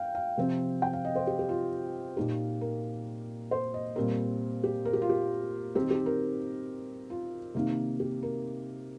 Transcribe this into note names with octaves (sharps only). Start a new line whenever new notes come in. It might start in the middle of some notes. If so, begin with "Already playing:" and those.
Already playing: F5 G5
F5
C3 F3 C4
G5
F5
D#5
C5
G4
G4
F4
A#2 A#3 D#4 G4
A#4
C5
D#5
A#2 G3 C4 A#4
G4
A#4
G4
F4
G4
D#3 C4 D#4 G4
G4
A#4
F4
C3 D#3 A#3 D#4
G4
A#4